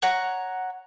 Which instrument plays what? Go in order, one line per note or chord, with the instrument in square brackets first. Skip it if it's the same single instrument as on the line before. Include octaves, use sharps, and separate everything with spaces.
[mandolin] C#5 F#5 A#5